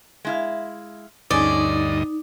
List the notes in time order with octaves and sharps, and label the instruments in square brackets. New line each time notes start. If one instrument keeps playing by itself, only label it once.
[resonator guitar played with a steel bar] G#3 E4 F5
[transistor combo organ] D2 G2 D#5 [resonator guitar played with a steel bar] C4 C#4 G#4 [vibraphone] D#4 [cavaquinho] D5